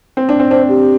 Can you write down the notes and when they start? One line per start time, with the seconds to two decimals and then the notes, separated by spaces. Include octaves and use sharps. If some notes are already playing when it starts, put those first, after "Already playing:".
0.17 C4
0.29 D4
0.40 C4
0.50 D4 C5
0.69 G4